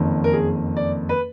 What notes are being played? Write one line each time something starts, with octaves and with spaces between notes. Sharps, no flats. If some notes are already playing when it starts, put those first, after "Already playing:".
Already playing: F#1 F2 D#3
A#4
G#4
D5
B4